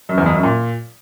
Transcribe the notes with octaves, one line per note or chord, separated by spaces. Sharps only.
F#2
E2
F2
F#2
A#2